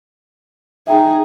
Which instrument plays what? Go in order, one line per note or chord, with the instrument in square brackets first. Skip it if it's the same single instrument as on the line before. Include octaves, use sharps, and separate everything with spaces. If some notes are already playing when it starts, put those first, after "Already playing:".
[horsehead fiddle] D#4 G#4 [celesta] E5 G5 A#5